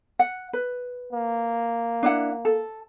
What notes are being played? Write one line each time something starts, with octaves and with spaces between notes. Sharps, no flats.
F#5
B4
A#3
D4 E4 F#5
A4